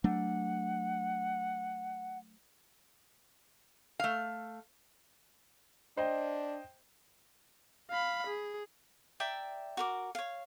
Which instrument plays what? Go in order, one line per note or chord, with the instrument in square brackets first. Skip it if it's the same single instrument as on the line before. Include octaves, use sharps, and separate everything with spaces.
[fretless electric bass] F#3 A3 D4 [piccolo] F#5
[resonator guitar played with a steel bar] A3 F5
[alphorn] D4 [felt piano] C5 D#5 G5
[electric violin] F5 B5
G#4
[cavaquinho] D5 E5 G5 A#5
F#4 A#4 D6
C#5 F5